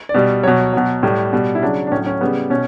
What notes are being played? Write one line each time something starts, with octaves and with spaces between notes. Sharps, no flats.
D5
B2 G3
B2 F#3 C#5
B2 F#3
A2 G3
B2 G3
E4
C#3 F#3 D4
D4
A2 F#3 C#4
C#4
C#3 G3 B3
B2 C#4